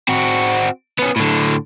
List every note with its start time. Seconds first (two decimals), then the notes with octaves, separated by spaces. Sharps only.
0.09 C4 F#4
0.99 B3 C#4
1.16 A2 D3